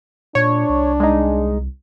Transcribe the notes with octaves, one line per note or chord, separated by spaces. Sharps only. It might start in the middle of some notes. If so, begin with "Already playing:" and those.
A#2 D4 C#5
C2
C2 G#3 D#4